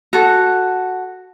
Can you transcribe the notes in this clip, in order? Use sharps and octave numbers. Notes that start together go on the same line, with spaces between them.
F#4 A4